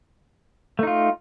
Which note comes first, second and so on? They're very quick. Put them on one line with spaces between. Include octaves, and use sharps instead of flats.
A3 D#4 F4